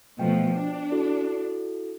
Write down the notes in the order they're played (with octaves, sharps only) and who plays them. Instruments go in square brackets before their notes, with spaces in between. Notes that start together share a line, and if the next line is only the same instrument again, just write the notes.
[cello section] B2 F3 A3 [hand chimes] G5
[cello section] D4
[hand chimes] E4 F#4 A4